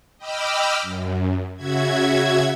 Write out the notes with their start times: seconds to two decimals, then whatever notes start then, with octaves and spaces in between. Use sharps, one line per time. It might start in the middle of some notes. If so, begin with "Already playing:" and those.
0.18 D#5 G5 B5 D6 E6 F6
0.82 F#2
1.56 C#3 F#4 E5 G#6